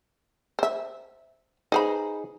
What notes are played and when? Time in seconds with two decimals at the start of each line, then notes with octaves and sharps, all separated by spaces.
0.59 C5 E5
1.72 D#4 G#4 B4 C5 A#5 B5